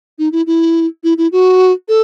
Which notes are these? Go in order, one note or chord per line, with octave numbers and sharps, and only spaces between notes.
D#4
E4
E4
E4
E4
F#4
A4